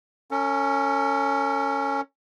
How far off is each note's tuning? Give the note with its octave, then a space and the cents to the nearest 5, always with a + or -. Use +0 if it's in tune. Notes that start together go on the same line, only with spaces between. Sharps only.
C#4 +0 A4 +45